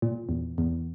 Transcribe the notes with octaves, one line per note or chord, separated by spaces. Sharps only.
A#2
E2
E2